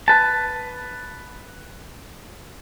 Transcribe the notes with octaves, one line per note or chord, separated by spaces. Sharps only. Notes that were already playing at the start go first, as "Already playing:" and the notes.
B4 A5